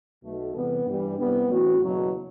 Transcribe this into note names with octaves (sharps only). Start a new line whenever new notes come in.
B1 B2 A3
E2 C3 G3 B3
G2 E3 G3
C2 C3 G3 B3
A1 A2 F#3 C4 F#4
F#1 E2 B2 F#3